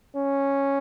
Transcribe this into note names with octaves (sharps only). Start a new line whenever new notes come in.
C#4